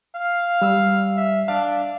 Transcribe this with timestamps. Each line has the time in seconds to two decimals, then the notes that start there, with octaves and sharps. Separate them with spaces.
0.15 F5
0.62 G3 E6
1.16 E5
1.48 D4 F5